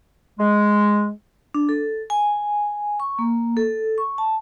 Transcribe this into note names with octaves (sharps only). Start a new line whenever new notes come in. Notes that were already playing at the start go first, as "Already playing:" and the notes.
G#3
D4
A4
G#5
C#6
A#3
A4
C#6
A5